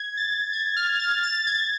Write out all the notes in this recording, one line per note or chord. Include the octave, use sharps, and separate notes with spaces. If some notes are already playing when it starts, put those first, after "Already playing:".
Already playing: G#6
A6
G#6
F6
A6
A6
G#6